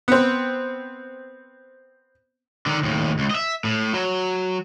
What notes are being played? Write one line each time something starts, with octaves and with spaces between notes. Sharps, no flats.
B3 C4
D3 D#3
D#2 A2
C#2
D#5 E5
A2
F#3